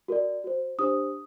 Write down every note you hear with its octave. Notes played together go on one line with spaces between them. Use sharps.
F#4 A#4 D5
F#4 C5
D4 G4 C5 D#6